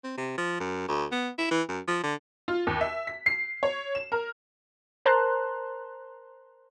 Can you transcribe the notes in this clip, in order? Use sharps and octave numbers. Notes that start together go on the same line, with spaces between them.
C4
C3
F3
F#2
D2
B3
E4
E3
F#2
F3
D3
F4
D#2
E5
B6
C7
C#5
E7
A#4
A#4 C5 A5 A#5 C6 F#6